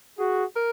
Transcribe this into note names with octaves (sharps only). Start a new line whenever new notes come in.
F#4 G#4
A#4